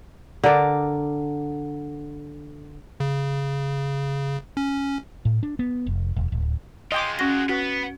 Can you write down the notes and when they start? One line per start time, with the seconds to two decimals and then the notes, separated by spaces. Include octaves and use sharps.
0.44 D3 A#4 D5
3.00 C#3
4.57 C#4
5.25 A2
5.43 D4
5.59 B3
5.87 F1
6.16 E1
6.32 D1
6.92 G#3 F4 D#5 G5 C6 D6
7.19 C#4 F#4 A#6
7.49 B3 F#4 B4